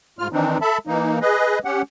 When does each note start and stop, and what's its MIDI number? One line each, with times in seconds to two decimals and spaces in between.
0.19 0.28 44
0.19 0.28 65
0.19 0.28 89
0.33 0.58 51
0.33 0.58 52
0.33 0.58 60
0.33 0.58 62
0.33 0.58 63
0.61 0.78 69
0.61 0.78 76
0.61 0.78 81
0.61 0.78 83
0.87 1.19 52
0.87 1.19 58
0.87 1.19 63
1.21 1.59 68
1.21 1.59 71
1.21 1.59 75
1.65 1.82 61
1.65 1.82 67
1.65 1.82 78